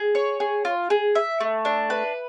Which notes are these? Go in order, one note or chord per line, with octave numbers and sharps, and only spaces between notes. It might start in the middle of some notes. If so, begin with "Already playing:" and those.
Already playing: G#4
C#5
G#4
F4
G#4
E5
A3
D4
B4